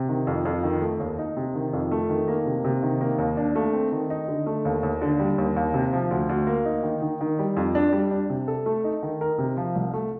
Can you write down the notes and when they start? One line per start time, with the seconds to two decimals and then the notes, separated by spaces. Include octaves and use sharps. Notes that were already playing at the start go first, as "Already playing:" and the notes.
Already playing: C3
0.09 D#3
0.27 F2
0.45 F2
0.63 D#3
0.82 A3
1.00 D#2
1.19 D#4
1.37 C3
1.55 D#3
1.73 F2
1.92 A3
2.10 D#3
2.28 A#3
2.46 C3
2.64 C3
2.83 D#3
3.01 A#3
3.18 D#2
3.37 D4
3.56 A3
3.73 C4
3.92 D#3
4.10 D#4
4.28 D3
4.46 A3
4.65 D#2
4.83 D#2
5.01 D3
5.19 G3
5.38 D#2
5.56 D#2
5.74 C3
5.93 F3
6.11 D2
6.29 D2
6.47 A#3
6.65 D#4
6.83 D#3
7.02 D#3
7.21 D#3
7.39 G3
7.56 F2
7.75 D4
7.93 G3
8.11 D4
8.30 C3
8.48 A4
8.66 A3
8.84 D#4
9.03 D#3
9.21 A#4
9.38 C3
9.57 F3
9.76 C2
9.94 A3